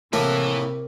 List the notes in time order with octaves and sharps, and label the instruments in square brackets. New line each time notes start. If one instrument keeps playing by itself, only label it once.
[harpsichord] A2 A3 A#3 [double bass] C3 [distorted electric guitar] E4 B4 [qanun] A#4